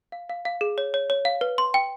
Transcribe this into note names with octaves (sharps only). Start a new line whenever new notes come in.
F5
F5
F5
G#4
C#5
C#5
C#5
F5
B4
C6
G5